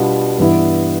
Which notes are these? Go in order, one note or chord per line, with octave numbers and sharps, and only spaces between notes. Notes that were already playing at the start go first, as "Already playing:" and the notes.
Already playing: B2 G3 B3 D4 F4
G2 E3 B3 E4